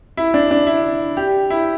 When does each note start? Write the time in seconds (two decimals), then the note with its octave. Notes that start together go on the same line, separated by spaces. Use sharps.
0.17 E4
0.34 D4
0.51 D4
0.67 E4
1.17 G4
1.50 E4